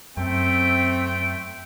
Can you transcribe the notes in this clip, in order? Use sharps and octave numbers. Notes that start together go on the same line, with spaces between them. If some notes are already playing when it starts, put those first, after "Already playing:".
F#2 A3 C4 E5 G5